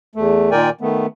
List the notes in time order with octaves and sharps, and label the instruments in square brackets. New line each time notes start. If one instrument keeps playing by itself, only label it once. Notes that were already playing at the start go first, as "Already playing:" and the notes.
[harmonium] E2 A3
A#2 D#3 A#4 D5 G5 G#5
D#3 A3 B3